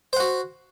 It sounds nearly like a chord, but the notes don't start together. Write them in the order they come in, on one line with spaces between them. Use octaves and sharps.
C5 F#5 F#4